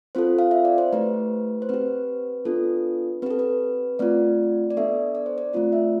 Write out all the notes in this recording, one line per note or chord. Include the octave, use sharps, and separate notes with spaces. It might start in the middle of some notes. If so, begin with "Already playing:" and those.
C4 F4 A4 C5
F5
E5
D5
C5
A3 E4 G4 B4
C5
C4 G4 B4
B3 D4 F4 A4
C4 G4 A4 B4
B4
A3 C4 F4 D5
D5
B3 D4 A4 E5
D5
C5
D5
A3 C4 F4 D5
E5